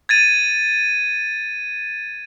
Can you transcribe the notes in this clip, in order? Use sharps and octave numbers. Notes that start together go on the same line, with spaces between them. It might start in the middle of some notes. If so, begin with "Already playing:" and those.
G#6 A6 D#7